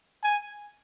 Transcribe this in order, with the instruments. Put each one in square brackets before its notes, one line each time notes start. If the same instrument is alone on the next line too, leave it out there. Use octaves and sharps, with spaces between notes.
[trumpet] G#5